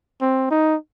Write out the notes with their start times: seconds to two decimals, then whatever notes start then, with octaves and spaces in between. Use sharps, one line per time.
0.22 C4
0.51 D#4